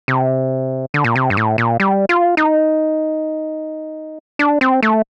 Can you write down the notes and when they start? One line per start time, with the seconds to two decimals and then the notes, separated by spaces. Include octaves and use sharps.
0.08 C3
0.94 D3
1.04 A#2
1.15 C3
1.30 G2
1.37 A2
1.58 A#2
1.80 G3
2.09 F4
2.37 D#4
4.39 D4
4.61 C4
4.83 A3